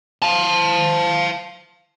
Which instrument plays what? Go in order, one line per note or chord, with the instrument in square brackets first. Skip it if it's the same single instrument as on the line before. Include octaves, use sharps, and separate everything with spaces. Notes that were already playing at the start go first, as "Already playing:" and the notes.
[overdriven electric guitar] F5 A5